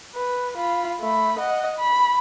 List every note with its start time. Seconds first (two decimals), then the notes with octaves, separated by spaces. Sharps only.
0.15 B4
0.57 F4 B5
1.00 A3 B5
1.39 D#5 F#5
1.78 B5